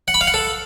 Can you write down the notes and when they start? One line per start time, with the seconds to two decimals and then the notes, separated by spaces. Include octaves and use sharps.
0.08 F#5
0.14 B5
0.21 F5
0.27 F#5
0.34 A4